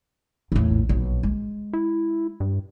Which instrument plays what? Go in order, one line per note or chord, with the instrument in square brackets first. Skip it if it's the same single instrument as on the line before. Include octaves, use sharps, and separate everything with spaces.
[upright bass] E2 A2
[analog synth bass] A#1
[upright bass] B1
G#3
[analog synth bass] E4
G2